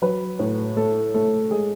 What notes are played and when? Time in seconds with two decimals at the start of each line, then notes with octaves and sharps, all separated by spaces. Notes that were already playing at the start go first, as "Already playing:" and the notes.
0.02 F#3 B4
0.39 A2
0.77 A3 A4
1.14 A3 A4
1.51 G#3 G#4